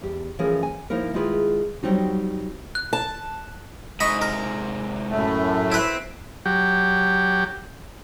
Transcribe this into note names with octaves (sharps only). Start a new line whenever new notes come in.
E2 G4
E3 F3 A3 C#4 G#4 A#4
G#5
F3 A#3 D#4 E4 A#4
D#3 G#3 E4 F4 G#4 B4
F#3 G3 C4 D#4 F#4
F#6
A5
G#2 C3 D#5 B5 C#6
A#4
F#2 A2 A3
C4 E4 B4
F#3 G4